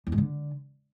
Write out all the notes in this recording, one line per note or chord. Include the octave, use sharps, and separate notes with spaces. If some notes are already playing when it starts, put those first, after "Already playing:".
E2
G#2
D3